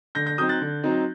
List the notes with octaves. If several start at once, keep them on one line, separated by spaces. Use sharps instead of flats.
D3 G6 A#6
G6 A#6
F#3 C4 D#4 D#6 G6
F#6 A6
D3
F#3 C4 D#4